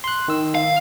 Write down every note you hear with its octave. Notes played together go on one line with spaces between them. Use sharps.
C6 F#6
D#3 E6
F5